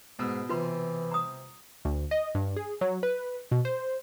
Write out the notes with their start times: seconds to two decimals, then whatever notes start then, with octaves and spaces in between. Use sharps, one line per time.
0.19 G#2 B2 E6
0.49 C3 E3 F4 B4 C6
1.12 A#5 D#6
1.85 D2
2.11 D#5
2.35 G2
2.56 G#4
2.81 F#3
3.03 B4
3.51 B2
3.65 C5